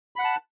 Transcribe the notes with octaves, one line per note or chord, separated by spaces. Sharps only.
F#5 A5 B5 F#6